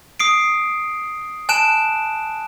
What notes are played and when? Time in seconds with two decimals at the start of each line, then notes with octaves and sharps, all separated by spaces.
0.20 D#6 C7 D7
1.49 G#5 A5 F#6 D7 E7